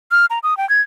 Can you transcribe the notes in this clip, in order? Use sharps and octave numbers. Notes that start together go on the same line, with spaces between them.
F6
A#5
D#6
G5
G#6